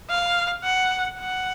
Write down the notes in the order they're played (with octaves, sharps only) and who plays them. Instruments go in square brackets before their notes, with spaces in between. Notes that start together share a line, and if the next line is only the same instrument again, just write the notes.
[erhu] F5
F#5
F#5